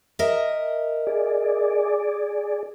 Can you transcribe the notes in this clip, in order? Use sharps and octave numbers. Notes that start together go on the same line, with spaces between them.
A#4 D#5 E5
G#4 D5